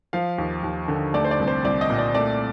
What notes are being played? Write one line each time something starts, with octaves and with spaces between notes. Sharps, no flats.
F3 F5
D#2
D#2
D3
A3 D5
C5
D5
C2
C5
C2 D5
D#5
A#2
D5
A3 D5